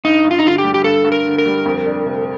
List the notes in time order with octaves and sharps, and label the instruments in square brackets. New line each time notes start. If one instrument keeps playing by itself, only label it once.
[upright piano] G2 [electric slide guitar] D#4
[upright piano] G2
[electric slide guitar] F4
D#4
[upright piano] D3 [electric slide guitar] F4
[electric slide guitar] G4
[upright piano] G3
[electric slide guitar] G4
[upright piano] G2 [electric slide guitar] A4
[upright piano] G2
[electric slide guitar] A#4
[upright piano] D3
[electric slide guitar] A#4
[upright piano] G3
F2
D4
C3